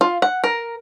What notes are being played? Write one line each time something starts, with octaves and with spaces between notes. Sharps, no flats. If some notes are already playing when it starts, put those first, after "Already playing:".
F4
F#5
A#4